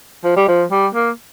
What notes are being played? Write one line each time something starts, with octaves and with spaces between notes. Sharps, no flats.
F3
G3
F3
G3
A#3